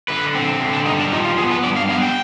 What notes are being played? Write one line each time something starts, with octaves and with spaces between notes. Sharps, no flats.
D3 B4
C4
D3
D4
G3 D#4
D4
F3 D#4
F4
B3 G#4
B4
G2 D5
F5
B3 F5
G5